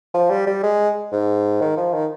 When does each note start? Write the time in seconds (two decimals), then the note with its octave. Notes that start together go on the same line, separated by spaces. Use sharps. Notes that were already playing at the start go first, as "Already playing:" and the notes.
0.14 F3
0.30 G3
0.47 G3
0.63 G#3
1.12 G#2
1.61 D#3
1.77 F3
1.93 D#3